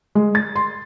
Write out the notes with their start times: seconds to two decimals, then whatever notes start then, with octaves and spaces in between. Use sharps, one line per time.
0.15 G#3
0.35 A6
0.56 C6